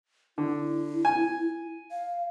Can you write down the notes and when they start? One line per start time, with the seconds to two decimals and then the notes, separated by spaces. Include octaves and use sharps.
0.38 D3 E4
1.05 G#5
1.92 F5